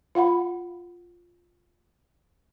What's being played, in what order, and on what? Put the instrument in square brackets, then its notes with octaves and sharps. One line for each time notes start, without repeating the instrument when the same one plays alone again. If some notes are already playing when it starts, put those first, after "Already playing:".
[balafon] F4 F5 F#5 B5